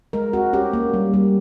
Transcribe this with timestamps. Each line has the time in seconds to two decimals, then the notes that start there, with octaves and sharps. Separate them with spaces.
0.13 G#3 A#4
0.33 C4 F#4
0.53 C#4 G4
0.73 A#3
0.94 G3
1.14 G3